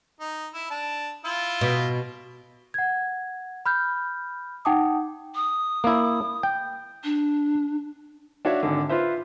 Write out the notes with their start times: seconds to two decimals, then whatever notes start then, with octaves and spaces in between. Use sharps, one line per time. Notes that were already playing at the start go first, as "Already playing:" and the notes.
0.20 D#4
0.54 E4
0.70 D4
1.25 E4 F4
1.61 B2
2.74 F#5 G#6
3.66 B5 F6 G6
4.65 D#4 F#5 G5 A5 D6 D#6
5.35 D#6
5.84 A#3 E4
6.43 G5
7.04 D4
8.45 D4 F#4 C#5 E5 F5
8.63 G#1 D3
8.89 F4 B4 C5 E5